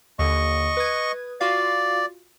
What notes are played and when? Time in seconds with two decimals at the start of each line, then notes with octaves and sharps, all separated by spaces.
0.19 D#2 D3 D#5 C#6
0.77 B4 D#6 G#6
1.41 F4 F#4 D5 F5